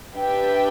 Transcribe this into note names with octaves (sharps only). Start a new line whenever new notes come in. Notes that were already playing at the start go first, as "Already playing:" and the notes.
D4 G4 B4 E5 G5